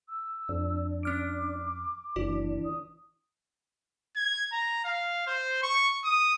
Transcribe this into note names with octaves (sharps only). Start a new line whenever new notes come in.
E6
F2 D4
C#4 D6 F6 D7
F#1 E3 D4 F#4
D#6
G#6
A#5
F5
C5
C#6
D#6